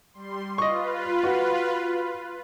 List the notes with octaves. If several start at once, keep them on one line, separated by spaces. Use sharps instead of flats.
G3 C6
F4 B4 D#5 C#6
F#4